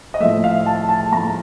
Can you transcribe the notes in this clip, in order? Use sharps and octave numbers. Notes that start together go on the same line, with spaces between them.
D#5
A2 F3 A3 E5
F5
A5
A5
A2 F3 A3 A#5